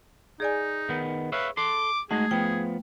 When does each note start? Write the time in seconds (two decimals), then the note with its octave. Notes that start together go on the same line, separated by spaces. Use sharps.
0.40 D#4 G#4 D5 G#5
0.89 D#3 B3
1.32 B4 C#5 E5 F5
1.57 A4 C6 D6
2.11 G#3 A3 D#4 F#4 G#4
2.31 F3 B3 G5